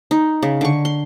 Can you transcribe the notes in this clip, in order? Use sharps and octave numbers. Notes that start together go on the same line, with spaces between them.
D#4
C#3
D3 C#6
C6